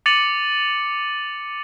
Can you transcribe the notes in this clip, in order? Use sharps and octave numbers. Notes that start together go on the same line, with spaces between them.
D6 A6 C#7 D#7 F#7